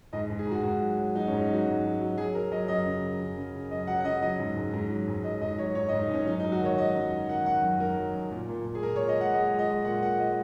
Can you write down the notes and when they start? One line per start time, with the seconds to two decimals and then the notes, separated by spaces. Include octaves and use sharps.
0.13 G#2 D#5
0.30 G#2
0.39 G#4
0.47 G#2 F#4
0.63 G#2 F#4
0.81 F#3
0.98 F#3
1.15 F#3 D#4
1.28 C#4
1.32 G#2
1.41 D#4
1.49 F#3 F#4
1.66 G#2
1.84 F#3
2.01 F#3
2.17 F#3 G#4
2.35 F#3 A#4
2.52 F#3 D#5
2.68 F#2 D#5
2.86 C#3
3.03 F#2
3.20 F#2
3.37 C#3
3.54 C#3
3.71 F#2 D#5
3.87 F#3 F#5
4.00 F#5
4.04 C#3 D#5
4.22 F#3 D#5
4.39 G#2
4.56 G#2
4.73 G#2
4.90 F#3
5.08 G#2
5.24 F#3 D#5
5.41 G#2 D#5
5.58 F#3 C#5
5.75 G#2 C#5
5.88 D#5
5.93 G#2
6.01 D#4
6.09 G#2 C#4
6.27 F#2 D#4
6.40 D#4
6.44 F#3
6.52 F#4
6.61 D#3 C#5
6.78 D#3 D#5
6.95 F#2
7.12 F#3
7.29 D#3 F#5
7.46 D#3 F#5
7.63 F#2
7.80 F#2 A#4
7.97 F#3
8.14 F#2
8.31 A#2
8.49 A#2
8.65 A#2
8.75 G#4
8.83 A#2 A#4
8.96 C#5
9.00 A#2
9.08 D#5
9.16 G#3 F#5
9.33 G#3 D#5
9.51 G#3
9.59 D#5
9.68 G#3
9.85 A#2 F#5
10.02 A#2 F#5
10.18 G#3 D#5